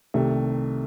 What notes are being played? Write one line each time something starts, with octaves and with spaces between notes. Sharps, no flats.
C2 C3 D#3 A3